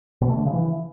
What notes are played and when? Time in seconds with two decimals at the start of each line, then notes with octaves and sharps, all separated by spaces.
0.21 B2
0.29 A3
0.37 D3
0.45 C#3
0.53 E3